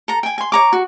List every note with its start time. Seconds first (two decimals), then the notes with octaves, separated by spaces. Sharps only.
0.08 A4 A#5
0.23 G5 G#5
0.38 G#5 C6
0.52 C#5 A#5 D6
0.73 F#4